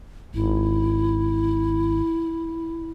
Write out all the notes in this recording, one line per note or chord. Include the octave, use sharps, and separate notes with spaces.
G#1 E4